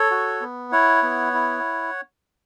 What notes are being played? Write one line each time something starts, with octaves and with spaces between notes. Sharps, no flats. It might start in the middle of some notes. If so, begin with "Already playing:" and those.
Already playing: A4 C#5
F#4
B3
E4 C#5 F#5
B3
E4